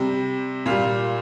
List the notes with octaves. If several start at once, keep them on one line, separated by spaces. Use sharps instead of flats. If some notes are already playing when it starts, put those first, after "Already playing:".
Already playing: C3 G3
A#2 G3 F4